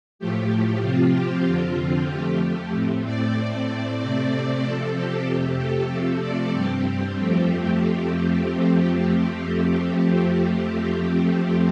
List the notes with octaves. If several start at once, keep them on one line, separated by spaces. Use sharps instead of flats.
A2 F3 A3 G4
C3 F3 C4 F4
G4
F2 D3 F3 C4 F4
F2 F3 A3 G4
A2 A3 C4
D5
A2 A3 C4 D5
C3 A3 C4 D5
C3 F3 C4 A4
G4
F2 C3 A3
A4
C3 F3 A3 C4
D5
G2 G3 C4 G4
F2 F3 A3 C4